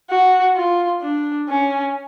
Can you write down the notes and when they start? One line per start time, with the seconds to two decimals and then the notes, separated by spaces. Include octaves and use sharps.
0.10 F#4
0.56 F4
1.02 D4
1.49 C#4